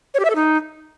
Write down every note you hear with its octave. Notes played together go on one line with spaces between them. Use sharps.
C#5
G4
E5
A4
D#4